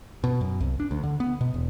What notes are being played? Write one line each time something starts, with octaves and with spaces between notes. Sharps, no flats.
B2
F#2
C2
D4
D2
D3
B3
B2
E1